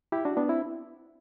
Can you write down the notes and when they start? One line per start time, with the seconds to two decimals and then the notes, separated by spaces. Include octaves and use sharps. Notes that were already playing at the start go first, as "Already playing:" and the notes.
0.12 E4 G4
0.25 D4 F#4
0.37 B3 D4
0.49 C4 E4